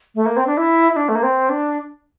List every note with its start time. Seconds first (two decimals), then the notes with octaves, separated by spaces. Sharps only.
0.15 A3
0.26 A#3
0.37 C4
0.47 D4
0.57 E4
0.92 E4
0.96 D4
1.09 A3
1.15 A#3
1.23 C4
1.49 D4